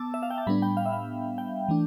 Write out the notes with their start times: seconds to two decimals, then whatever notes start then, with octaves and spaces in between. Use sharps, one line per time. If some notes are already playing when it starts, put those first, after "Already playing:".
Already playing: B3 A5 D6 E6
0.14 E5
0.23 F5
0.30 G5
0.38 A5
0.47 A2 G3 B3 D4 B5
0.62 G5
0.77 F5
0.86 E5
0.92 F5
1.38 G5
1.68 E3 A3 D4